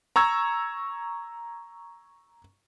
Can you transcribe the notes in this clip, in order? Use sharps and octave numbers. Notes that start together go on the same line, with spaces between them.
A#5 C#6 E6 G#6